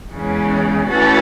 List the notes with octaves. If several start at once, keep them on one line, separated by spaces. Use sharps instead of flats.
E2 C#3 E3 G#3 C#4
E3 A3 C#4 F#4 A4